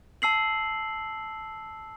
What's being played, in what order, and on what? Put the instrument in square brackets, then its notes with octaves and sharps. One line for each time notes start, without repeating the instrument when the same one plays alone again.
[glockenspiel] A5 E6 C7 F#7